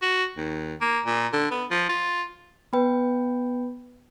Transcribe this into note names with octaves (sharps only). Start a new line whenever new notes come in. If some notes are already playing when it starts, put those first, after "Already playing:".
F#4
D#2
A#3
A#2
D3
B3
F3
F4
B3 B4 G5 B5